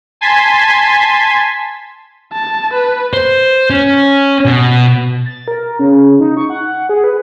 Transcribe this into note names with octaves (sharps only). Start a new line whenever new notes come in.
G#5 A5 C6 G#6 B6
A5
B4
C5
C#4
B2
A6
A#4
C#3
D#4
C#6
F#5
G#4
B4